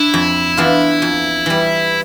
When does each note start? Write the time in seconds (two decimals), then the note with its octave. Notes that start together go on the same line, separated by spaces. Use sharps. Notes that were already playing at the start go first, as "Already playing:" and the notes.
Already playing: D4 E4
0.14 F2
0.57 E3 B3 D4 F4
1.02 F2
1.46 E3 G3